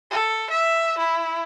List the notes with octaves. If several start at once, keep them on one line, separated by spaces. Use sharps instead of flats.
A4
E5
E4